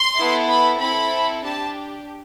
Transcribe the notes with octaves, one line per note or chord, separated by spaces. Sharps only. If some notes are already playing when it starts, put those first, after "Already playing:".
Already playing: C6
B3 E4 A4
B5
C4 E4 A4 B5
D4 G4 A5